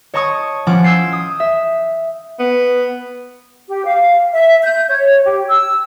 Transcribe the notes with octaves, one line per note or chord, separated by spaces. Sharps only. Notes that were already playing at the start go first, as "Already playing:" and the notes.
C#5 D#5 A5 C#6 D#6
F3 C#4 F#5 D6
E6 G6 G#6 C7
D#6
E5
B3
G4
F5
E5
G6
C#5
G4
E6